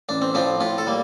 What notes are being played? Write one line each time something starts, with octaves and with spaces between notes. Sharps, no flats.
A1 D4
C4
A2 F3 C4 D4
A2 F4
A4
G3 A#3